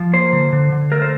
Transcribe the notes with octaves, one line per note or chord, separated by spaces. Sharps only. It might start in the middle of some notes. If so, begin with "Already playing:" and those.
Already playing: F3
A#3 C5
D3
D3
D3
A3 A#4
C5